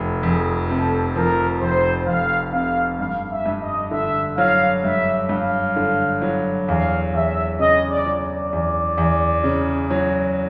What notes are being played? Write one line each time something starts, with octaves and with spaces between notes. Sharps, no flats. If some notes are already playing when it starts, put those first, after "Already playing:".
Already playing: F1 F3
F2 G#4
C3 A4
F3 A#4
F1 C5
F2 F5
C3 F5
G2 F5
E5
G2
D#5
D3 E5
F#3 F5
G2 E5
G2 F5
D3
F#3
E2 F5
E2 E5
C#3 D#5
D5
F#3
D5
E2
E2
C#3
F#3